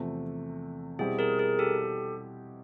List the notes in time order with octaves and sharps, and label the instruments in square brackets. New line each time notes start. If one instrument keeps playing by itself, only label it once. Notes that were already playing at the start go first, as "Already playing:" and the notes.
Already playing: [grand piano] E2 C3 F3 A3
[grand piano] B2 G3 C4 E4 G4 [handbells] G#4
[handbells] G#4 A#4
G#4 A#4
G4 A4